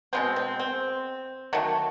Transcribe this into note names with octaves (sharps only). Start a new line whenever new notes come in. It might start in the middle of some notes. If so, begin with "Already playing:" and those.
B2 G#3 B3 C4
C4
C4
D#3 F#3 A3